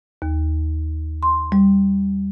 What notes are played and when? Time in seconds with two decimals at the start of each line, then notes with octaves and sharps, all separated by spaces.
0.22 D#2
1.23 C6
1.52 G3